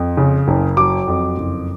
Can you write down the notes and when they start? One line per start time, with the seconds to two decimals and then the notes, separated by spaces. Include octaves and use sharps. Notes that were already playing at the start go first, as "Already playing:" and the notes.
Already playing: F2
0.17 C#3
0.48 F#1
0.77 F#3 D6
1.08 F2
1.38 F#1